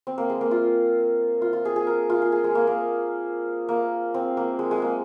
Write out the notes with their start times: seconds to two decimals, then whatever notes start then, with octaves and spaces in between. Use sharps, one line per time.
0.07 C4
0.18 A#3
0.30 G#3
0.41 A#3
0.51 F4
1.42 F4
1.53 F4
1.65 G#4
1.76 G#4
1.87 A#4
2.10 F4
2.22 G#4
2.32 G#4
2.44 G#3
2.55 A#3
2.67 A#3
3.69 A#3
4.14 C4
4.37 A#3
4.59 G#3
4.71 G#3
4.82 A#3